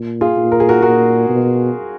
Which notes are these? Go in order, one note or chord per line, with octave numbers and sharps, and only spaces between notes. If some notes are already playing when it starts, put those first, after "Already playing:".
Already playing: A#2
F4 G#4
A#2
A#4
G#4
F#4 A#4
A#2 F#4 A#4
B2